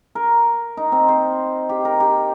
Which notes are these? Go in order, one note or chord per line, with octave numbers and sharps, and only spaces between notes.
A#4
D#4
C4
C5
G4
A#4
G4